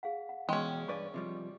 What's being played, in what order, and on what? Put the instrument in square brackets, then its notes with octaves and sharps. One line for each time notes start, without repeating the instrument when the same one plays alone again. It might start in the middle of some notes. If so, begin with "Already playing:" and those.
[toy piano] G#4 F5 F#5
F#5
[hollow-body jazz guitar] E2 B2 [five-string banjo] G#3 C#4 [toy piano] G5 C6
[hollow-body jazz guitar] G2 B4 D5 [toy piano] D4 C#6
[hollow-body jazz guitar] C3 F3 G3